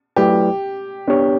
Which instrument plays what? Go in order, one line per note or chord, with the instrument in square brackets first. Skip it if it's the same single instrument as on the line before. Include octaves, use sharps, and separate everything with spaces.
[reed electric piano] F#3 A3 E4 B4 D5 [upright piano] G4
[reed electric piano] B3 D4 G4 C#5